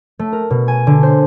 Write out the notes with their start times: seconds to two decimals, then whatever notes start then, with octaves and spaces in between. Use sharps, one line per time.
0.19 A3
0.32 A#4
0.50 B2
0.68 G#5
0.87 D3
1.03 C5